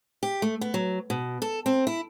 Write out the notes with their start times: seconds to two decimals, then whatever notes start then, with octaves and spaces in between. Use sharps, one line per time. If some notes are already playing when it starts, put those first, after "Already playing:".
0.23 G4
0.42 A3
0.61 B3
0.74 F#3
1.10 B2
1.42 A4
1.66 C4
1.87 E4